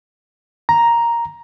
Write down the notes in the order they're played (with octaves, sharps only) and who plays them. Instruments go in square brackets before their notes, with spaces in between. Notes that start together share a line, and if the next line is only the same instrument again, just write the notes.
[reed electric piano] A#5